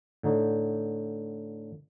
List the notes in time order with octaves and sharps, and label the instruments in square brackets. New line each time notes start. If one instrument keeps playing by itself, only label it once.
[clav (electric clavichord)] A2 D3 D#4 F#4